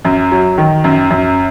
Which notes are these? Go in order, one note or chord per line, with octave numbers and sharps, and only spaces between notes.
F#2
F#3
D#3
F#2
F#2